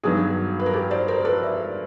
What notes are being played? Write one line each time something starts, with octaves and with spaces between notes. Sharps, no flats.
G2 D#3 F#3 B3 F#4 G#4
B4
A#4
G4 A4
C5 D5
A#4 C5
A#4
A4 B4
D5 E5